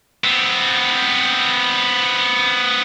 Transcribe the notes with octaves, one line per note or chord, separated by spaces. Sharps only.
B3 C4